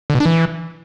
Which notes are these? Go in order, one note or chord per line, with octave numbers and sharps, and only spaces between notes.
D3
B2
D4
E3